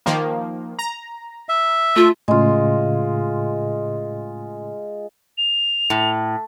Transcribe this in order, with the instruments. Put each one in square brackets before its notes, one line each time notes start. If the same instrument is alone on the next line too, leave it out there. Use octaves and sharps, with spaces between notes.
[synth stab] D#3 F3 A#3
A#5
[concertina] E5
[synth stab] A3 [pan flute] F4
[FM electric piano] A2 C#3 [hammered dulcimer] G#3 F4
[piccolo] F7
[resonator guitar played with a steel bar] A2